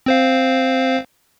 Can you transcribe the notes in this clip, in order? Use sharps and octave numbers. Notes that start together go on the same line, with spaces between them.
C4 C5 F5